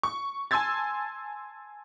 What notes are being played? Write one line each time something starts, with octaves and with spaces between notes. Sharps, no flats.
C#6
G#5 A5 C6 E6 G#6 A6